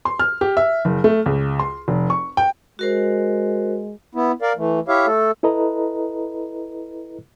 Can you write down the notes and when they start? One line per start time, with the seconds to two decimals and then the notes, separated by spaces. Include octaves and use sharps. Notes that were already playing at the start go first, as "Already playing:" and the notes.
0.05 C6
0.19 F6
0.41 G4
0.57 E5
0.85 F#1
1.04 A3
1.26 C#2
1.59 C6
1.88 F1
2.10 C#6
2.37 G5
2.79 G#3 F#4 A#4 C5
4.15 B3 E4
4.42 A#4 D5 F5
4.57 E3 A3
4.88 E4 G4 C#5 E5 F5
5.07 A3 A4
5.43 E4 A4 B4 D#5 A#5